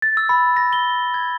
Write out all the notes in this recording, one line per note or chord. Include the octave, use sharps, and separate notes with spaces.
A6
E6
B5
A#6
G7
G#6